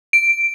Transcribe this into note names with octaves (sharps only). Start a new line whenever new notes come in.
D7